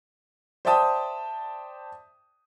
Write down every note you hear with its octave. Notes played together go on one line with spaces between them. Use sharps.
C5 D5 E5 G5 A5 D#6